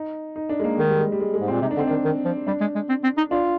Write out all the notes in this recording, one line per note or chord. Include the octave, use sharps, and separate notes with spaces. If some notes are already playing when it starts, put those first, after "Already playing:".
Already playing: D#4
D#4
D4
G#3
A#3
D#3 G#3
G3
G#3
G3
G#3
G#3
G#2
C4
A#2
C3 D#4
D4
D3 C4
D#3 D4
D#3
F3
G3 D4
G#3
G#3
C4
C4
D#4
D4 F4